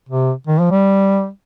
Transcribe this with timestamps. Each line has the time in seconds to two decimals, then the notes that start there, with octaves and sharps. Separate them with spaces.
0.09 C3
0.47 D#3
0.60 F3
0.71 G3